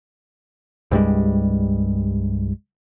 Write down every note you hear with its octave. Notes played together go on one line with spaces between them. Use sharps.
C2 G2 G3 G#3